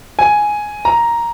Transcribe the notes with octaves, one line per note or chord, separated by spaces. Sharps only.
G#5
A#5